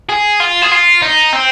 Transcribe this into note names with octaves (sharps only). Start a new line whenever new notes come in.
G#4
F4
G#4
F4
D#4
C4